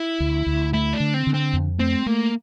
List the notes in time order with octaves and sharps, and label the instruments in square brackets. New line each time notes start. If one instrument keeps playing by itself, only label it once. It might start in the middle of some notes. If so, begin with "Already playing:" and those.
Already playing: [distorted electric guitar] E4
[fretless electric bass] D2
D2
[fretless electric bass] A3 [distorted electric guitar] E4
[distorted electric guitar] D4
[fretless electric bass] D3
[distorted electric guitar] C4
[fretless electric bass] D3
[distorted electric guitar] C4
[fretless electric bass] F2
[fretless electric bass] A3 [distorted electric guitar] C4
[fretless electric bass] A3 [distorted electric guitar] A#3